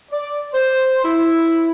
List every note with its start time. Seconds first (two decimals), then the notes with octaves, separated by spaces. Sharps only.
0.12 D5
0.53 C5
1.04 E4